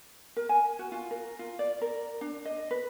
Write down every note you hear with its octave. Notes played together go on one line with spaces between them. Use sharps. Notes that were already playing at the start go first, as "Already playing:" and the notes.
A#4
G#5
F#4
F4
A#4
F4
D5
A#4
D4
D#5
B4